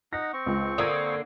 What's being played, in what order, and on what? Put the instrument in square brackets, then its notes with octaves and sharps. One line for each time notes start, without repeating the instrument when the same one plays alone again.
[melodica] D#4 F#5 [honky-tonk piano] A#6
[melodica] C4 C#6
[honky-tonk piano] C#2
[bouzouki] D3 A#3 [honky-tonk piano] D#6 G#6